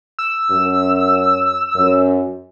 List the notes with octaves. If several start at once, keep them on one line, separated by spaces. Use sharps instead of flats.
E6
F#2
F#2